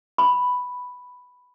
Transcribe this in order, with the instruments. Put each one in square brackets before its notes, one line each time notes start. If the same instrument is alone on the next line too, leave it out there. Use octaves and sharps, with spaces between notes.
[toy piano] B5